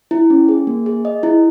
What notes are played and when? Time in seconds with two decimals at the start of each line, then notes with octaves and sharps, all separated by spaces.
0.11 E4
0.30 C#4
0.49 G#4
0.67 A#3
0.86 G#4
1.05 D#5
1.23 E4